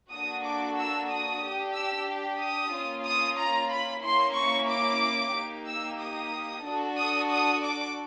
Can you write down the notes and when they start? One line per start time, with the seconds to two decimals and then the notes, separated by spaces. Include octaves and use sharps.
0.12 A#3 D4 F#4 A4 D#6
0.45 D6
0.78 E6
1.10 D#6
1.43 D4 G4
1.76 E6
2.41 D#6
2.73 A#3 C#4 F4
3.06 D#6
3.39 A#5
3.71 B5
4.04 A#3 C#4 E4 C6
4.36 C#6
4.69 D6
5.35 A#3 D#4 G4
5.67 E6
6.00 D#6
6.65 D4 F#4 A4
6.98 D#6
7.31 D#6
7.63 D6